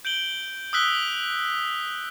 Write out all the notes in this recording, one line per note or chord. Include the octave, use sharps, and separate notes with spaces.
G6 D7 F#7 G7
D#6 E6 F#6 B6 G7